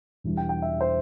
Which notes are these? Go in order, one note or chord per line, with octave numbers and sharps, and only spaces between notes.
E1 E2 E3 G3
G5
G5
E5
C5